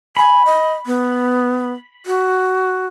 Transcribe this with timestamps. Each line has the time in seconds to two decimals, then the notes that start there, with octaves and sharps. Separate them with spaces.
0.17 G#5 B5
0.45 D#5
0.86 B3
2.06 F#4